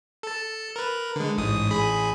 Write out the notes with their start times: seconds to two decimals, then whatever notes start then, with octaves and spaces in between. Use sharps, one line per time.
0.23 A4 A5
0.76 A#4 B4
1.16 D3 G#3
1.38 A1 G#2 D#6
1.71 A1 G#4 B5